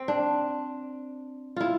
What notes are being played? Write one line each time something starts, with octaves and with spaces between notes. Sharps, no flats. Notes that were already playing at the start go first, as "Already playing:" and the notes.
Already playing: C4
D4
E4 F4